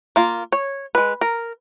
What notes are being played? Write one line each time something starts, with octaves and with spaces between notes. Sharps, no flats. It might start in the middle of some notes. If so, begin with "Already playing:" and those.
A#3 F4
C#5
G#3 B4
A#4